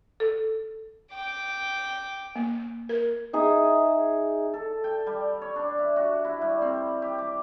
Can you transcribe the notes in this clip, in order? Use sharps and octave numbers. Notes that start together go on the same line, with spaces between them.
A4
G5 D6
A#3
A#4
D#4 G#4 E5
A4
G5
G3
C#5
D4
E5
F#4
E4
G3
C4
G4
D6